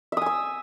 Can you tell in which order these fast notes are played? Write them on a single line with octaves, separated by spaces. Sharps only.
E5 D#6 G#5 E6